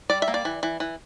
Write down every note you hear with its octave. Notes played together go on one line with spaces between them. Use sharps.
G3 D5
E5
A#3
D5
E3
E3
E3